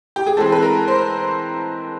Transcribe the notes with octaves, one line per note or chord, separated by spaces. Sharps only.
G4
G#4
E3 G#3 C4 A4
B4
A#4
C5